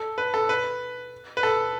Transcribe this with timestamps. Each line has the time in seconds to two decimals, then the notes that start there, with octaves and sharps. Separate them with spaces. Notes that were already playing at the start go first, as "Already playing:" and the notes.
Already playing: A4
0.18 B4
0.34 A4
0.49 B4
1.37 B4
1.43 A4